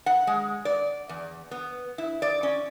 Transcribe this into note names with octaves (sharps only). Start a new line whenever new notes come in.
F#5
G#3
D5
E2
B3
E4
D5
C#4